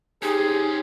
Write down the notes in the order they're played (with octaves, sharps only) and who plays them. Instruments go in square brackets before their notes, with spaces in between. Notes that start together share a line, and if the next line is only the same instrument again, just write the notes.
[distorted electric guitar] C#4 C5 [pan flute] D#4 [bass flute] G4 [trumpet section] G#4